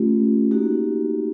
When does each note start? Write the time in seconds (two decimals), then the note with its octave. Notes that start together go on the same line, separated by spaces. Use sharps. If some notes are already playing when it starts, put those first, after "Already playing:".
Already playing: A3 C#4 F4 G4
0.51 A#3 D#4 F#4 G4